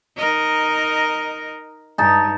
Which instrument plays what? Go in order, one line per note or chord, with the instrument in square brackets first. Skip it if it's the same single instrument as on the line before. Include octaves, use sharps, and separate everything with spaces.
[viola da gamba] D#4 A#4 D#5
[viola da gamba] G2 [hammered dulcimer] D#4 A5